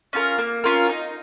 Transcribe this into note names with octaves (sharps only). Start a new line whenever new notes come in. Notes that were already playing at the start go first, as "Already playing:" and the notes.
C#4 F4 A#4
A#3
C#4 F4 A#4
D#4